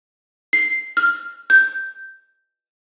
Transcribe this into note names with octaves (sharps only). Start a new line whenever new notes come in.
C7
F6
G6